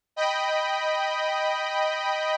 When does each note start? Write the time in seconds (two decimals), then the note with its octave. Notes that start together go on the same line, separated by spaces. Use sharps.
0.16 D#5 G5 B5